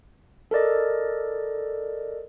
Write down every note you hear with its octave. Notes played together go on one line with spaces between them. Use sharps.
A4 A#4 D5 D#5